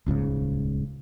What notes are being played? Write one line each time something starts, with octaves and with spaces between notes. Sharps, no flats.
D#1 C#2 G#2 C#3